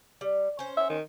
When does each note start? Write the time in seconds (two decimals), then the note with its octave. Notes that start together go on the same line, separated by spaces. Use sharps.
0.21 G3
0.59 C#4 C5
0.77 E5
0.89 D#3